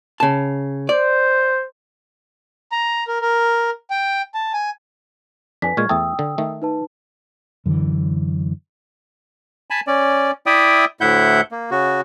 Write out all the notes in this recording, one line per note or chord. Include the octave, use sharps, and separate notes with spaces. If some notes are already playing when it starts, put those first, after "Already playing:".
C#3 A5
C5 D5
A#5
A#4
A#4
G5
A5
G#5
F2 D4 B4 G#5 B6
A#2 G#3 C#6 F6 G#6
E2 A3 G5 A5 D#6 E6
D3
D#3 A3
D#4 B4 A5
F#2 D3 E3
G#5 A5 B5
C#4 D5
E4 D5 E5 G5 D#6
D2 A2 E4 E5 F#5 G6
A#3
C#3 F#4